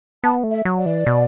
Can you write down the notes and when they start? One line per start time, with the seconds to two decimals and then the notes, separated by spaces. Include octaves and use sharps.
0.24 B3 A5
0.44 A3
0.51 E5
0.65 F#3
0.79 D5
0.86 E3
1.06 B2